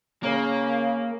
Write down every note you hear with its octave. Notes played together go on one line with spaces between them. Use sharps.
C#3 A#3